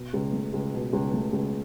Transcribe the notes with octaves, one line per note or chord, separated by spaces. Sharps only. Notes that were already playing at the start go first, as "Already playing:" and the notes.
Already playing: B2
C#2
A3
C#2
B2
C#2
A3
C#2